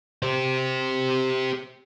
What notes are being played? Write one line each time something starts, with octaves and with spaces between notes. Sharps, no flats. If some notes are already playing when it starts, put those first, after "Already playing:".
G4 C5